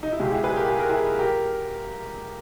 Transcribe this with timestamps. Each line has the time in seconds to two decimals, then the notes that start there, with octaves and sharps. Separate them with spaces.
0.03 D#4
0.12 E4
0.19 C#2 B2 G#3 G4
0.31 E4 G#4
0.44 G#4 B4
0.56 G4 A#4
0.70 G#4
0.79 A#4
0.89 E4 G#4
1.19 G4 A#4